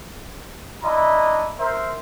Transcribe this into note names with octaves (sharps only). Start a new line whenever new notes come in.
D4 E4 D#5 A#5
A#4 C5 E5